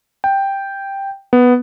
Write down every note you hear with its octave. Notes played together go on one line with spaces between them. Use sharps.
G5
B3